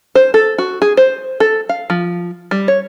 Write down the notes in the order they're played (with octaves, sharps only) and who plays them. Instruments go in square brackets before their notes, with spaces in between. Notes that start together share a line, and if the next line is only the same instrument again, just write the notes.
[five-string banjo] C5
A4
F#4
G#4
C5
A4
F5
F3
G3
C#5